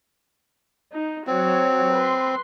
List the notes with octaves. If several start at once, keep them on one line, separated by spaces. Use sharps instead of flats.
D#4
F#3 C4 F#4 C#5
B4 C6